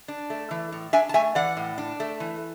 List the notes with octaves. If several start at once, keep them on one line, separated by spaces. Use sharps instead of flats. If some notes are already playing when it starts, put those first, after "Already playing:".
D4
A3
E3
A2
D4 E5 G#5
A5
A3 E5 G#5
E3 D5 F#5
A2
D4
A3
E3